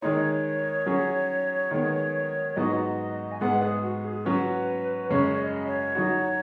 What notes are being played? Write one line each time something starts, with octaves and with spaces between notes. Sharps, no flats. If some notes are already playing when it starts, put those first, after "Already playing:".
D#3 G#3 D#4 C#5
F#3 C#4 G#4
D#3 G#3 B3
G#2 F#3 B3 D#4 F#4 D#5
G#5
G#2 G#3 B3 F#5
G#4
F#4
F#4
G#4
F#3 C#4 F#4 B4
F#2 C#3 G#3 C#4 C#5
D#5
C#5
F#3 D#4 F#4